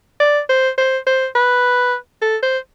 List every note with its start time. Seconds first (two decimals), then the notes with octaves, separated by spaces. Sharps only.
0.20 D5
0.49 C5
0.78 C5
1.07 C5
1.35 B4
2.22 A4
2.43 C5